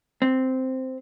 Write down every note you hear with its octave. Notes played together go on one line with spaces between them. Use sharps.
C4